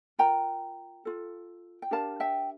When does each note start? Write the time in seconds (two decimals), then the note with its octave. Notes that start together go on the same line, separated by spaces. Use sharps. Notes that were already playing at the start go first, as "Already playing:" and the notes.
0.19 F4 A#4 G5 A#5
1.05 F4 A4
1.82 G5
1.91 D4 G4 A#4 F5 A5
2.20 E5 G5